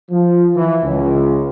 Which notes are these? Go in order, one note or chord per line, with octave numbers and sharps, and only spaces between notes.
F3
E3
C#2